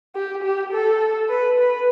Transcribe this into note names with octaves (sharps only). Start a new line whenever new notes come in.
G4
G4
A4
B4
B4